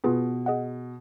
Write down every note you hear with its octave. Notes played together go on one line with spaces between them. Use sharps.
B2 B3 F4 G#4 B4
G#4 D#5 F#5